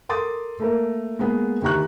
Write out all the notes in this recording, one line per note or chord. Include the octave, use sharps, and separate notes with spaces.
A4 A#4 C6 D6 D#6 A6
A3 A#3 A#4
G#3 A#3 B3 G#4
D2 D#3 G4 A#5 C#6 F#6